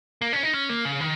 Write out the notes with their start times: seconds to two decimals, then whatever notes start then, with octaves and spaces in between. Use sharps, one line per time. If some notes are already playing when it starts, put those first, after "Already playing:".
0.22 A#3
0.33 C#4
0.43 D#4
0.54 C#4
0.69 A#3
0.85 C#3
1.00 D#3